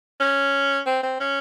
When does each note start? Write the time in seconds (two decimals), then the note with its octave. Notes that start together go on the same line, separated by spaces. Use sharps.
0.20 C#4
0.86 C4
1.03 C4
1.20 C#4